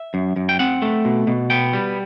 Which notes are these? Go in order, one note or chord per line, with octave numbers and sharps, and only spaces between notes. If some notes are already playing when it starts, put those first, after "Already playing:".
Already playing: E5
F#2
F#2
G5
C4 F#5
A3
B2
B2
B3 G5
G3